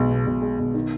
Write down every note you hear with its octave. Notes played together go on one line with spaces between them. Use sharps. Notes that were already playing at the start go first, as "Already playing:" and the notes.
Already playing: B1 G#3
B2
B1
G#3
B1
D#3